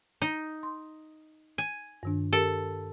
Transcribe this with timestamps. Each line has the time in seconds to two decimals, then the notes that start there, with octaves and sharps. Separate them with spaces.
0.22 D#4
0.63 C6
1.58 G#5
2.03 G2 D#3 D4
2.33 G4 A4 A#4